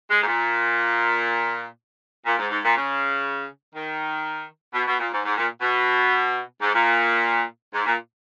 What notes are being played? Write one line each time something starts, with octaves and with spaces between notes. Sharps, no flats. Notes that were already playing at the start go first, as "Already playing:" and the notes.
G#3
G#2
A#2
A#2
G#2
G#2
A#2
C#3
D#3
B2
B2
A#2
G#2
G#2
A#2
B2
G#2
A#2
G#2
A#2